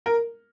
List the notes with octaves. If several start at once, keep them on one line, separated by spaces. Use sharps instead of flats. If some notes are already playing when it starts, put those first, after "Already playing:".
A#4